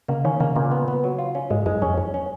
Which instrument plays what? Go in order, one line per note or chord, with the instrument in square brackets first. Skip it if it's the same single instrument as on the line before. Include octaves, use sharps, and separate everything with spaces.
[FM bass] C#3 [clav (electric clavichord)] A#3
[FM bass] D#3 [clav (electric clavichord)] C#4
[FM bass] C#3 [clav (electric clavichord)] A#3
[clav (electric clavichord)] A#2 [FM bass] C#3
[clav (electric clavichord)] B3
B3
F#3
F4
C#4
[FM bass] G#2 [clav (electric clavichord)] G#3
[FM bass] F#2 [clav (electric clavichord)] G#3
[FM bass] F2 [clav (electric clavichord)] C#4
[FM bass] F#2 [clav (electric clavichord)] C#4
[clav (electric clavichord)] C#4